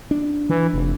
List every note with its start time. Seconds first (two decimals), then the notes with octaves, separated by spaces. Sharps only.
0.11 D4
0.50 E3
0.73 F1